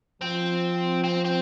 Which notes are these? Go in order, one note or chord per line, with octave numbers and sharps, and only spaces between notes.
F3 C4
C4
C4